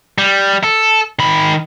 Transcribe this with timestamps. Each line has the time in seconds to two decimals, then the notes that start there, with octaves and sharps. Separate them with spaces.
0.18 G3
0.64 A4
1.19 D#3 B5